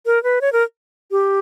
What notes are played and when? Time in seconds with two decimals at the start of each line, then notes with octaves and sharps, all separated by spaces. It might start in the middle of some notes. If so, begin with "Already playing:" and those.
0.06 A#4
0.23 B4
0.41 C#5
0.53 A#4
1.11 G4